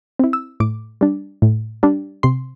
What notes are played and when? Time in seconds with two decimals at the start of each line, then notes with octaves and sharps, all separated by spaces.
0.19 C4 E4
0.33 E6
0.60 A2 D6
1.01 G3 D4
1.42 A2
1.83 G3 D4
2.23 C3 C6